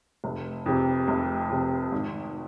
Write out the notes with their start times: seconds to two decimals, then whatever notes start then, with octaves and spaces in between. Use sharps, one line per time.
0.24 F1
0.66 F2 C3
1.08 F1
1.50 F2 C3
1.92 G#1